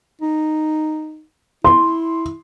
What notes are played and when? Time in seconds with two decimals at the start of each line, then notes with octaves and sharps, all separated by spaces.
0.21 D#4
1.65 E4 C6